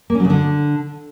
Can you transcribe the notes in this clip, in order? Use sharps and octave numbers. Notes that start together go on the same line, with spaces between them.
A#3
C#4
F#3
C#3
D3